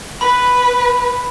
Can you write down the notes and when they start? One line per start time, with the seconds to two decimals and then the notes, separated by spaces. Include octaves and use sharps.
0.21 B4 B5